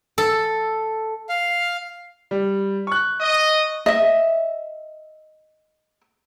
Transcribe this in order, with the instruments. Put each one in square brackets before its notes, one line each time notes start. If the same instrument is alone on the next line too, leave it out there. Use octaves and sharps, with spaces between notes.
[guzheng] A4
[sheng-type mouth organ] F5
[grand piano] G3
C#6 F#6
[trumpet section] D#5
[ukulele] D#5 E5